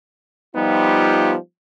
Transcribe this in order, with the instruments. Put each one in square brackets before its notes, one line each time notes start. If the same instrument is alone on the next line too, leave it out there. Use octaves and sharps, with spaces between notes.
[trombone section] F3 G3 B3 D#4 F4 G4